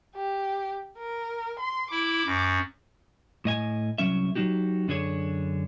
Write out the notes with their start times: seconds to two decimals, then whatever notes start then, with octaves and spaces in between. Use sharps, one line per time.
0.16 G4
0.98 A#4
1.59 C6
1.91 E4 D6
2.26 F#2
3.45 A2 D#5 G#5
3.98 C2 F#3 C#4 E5
4.35 F#3 G3 D#4 F#4 G4
4.88 F#2 D3 D4 G#4 C5 C#5